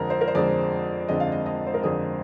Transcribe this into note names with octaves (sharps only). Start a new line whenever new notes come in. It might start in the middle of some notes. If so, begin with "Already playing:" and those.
Already playing: F2 D3 G#3 C4 A#4
C5
A#4
C5
F2 D3 G#3 C4 D5
F2 D3 G#3 C4 D#5
F5
D#5
D#5
C5
A#4
F2 D3 G#3 C4 G#4